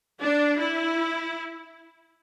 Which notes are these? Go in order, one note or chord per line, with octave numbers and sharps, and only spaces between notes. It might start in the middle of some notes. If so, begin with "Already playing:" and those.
D4
E4